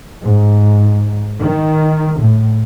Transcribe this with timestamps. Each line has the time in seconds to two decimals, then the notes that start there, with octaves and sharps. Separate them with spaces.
0.23 G#2
1.40 D#3
2.18 A2